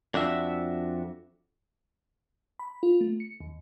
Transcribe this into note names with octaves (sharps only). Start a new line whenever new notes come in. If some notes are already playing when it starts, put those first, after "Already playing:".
F2 D4 F#4 E5
B5
F4
A3
C#7
D#2